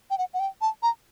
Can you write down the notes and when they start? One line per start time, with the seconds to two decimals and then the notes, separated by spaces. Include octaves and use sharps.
0.10 G5
0.18 F#5
0.34 F#5
0.40 G5
0.61 A5
0.83 A#5